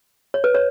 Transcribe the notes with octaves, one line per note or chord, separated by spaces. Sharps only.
C#5
B4
C#5